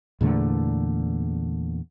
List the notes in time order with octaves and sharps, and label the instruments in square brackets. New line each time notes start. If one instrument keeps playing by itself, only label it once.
[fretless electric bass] E2 A#2 D3 A3